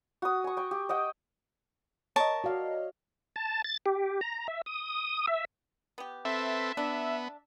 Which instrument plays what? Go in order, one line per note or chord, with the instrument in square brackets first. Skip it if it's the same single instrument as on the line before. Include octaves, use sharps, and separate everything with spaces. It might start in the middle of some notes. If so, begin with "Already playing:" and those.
[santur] F#4 D#6
G#5 C#6
G5 C#6
G4
D#5 F#5 G5
[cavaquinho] A#4 A5 C#6 [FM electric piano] C#5 D#5
[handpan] F#4 D5 F5
[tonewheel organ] A5
A6
G4
A#5
E5
D#6
E5
[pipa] B3 G4
[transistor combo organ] C4 A4 B4 [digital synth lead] E5
[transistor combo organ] B3 [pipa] D4